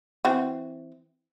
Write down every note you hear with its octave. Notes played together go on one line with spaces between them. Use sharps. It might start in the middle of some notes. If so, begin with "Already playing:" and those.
E3 C4 F#4